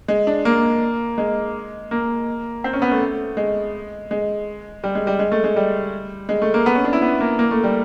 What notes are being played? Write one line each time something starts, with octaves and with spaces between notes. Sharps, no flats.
G#3
D4
A#3
G#3
A#3
C4
C#4
B3
A3
G#3
G#3
G3
G#3
G3
G#3
A3
G#3
G3
G#3
A3
A#3
B3
C#4
D4
E4
B3
A#3
A#3
A3
G3